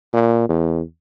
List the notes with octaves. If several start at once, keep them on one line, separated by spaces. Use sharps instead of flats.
A#2
E2